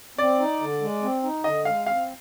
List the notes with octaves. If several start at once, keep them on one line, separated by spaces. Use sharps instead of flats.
C4 D5
D#4
D3
G#3
C4
D#4
D3 D#5
G#3 F5
C4 F5